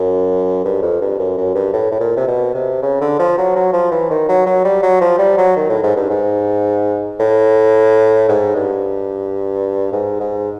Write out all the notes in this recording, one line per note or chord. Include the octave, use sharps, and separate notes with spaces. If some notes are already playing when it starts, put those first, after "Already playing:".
Already playing: F#2
G2
F2
G2
F#2
F#2
G2
A2
A2
A#2
C3
B2
C3
C#3
D3
F3
F#3
F#3
F3
E3
D#3
F#3
F#3
G3
F#3
F3
G3
F#3
D#3
A2
G#2
G2
G#2
A2
G#2
G2
G#2
G#2